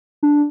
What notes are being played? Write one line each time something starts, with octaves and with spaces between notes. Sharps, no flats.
D4